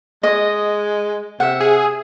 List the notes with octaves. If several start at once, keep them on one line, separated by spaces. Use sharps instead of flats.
G#3 D#5
C3 E5 F#5
G#4